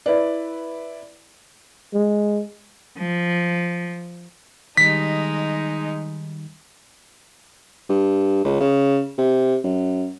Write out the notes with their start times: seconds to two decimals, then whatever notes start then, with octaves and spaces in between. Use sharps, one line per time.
0.06 E4 B4 D5
1.94 G#3
2.98 F3
4.77 D#3 G3 G#3 D#4 B6
7.89 G2
8.45 C#2
8.61 C#3
9.18 C3
9.64 F#2